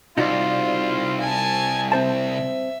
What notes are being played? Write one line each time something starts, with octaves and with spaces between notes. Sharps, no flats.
C2 D#4 F4 F#4 D5
G#5 A5
C4 C5 E5 A5